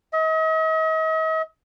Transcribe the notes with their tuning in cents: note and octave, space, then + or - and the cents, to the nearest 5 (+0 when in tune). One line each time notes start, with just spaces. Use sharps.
D#5 +40